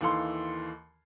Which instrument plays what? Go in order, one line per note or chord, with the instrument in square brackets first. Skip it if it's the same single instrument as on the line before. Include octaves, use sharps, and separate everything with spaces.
[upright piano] D#2 D#3 E3 A4 F5 C6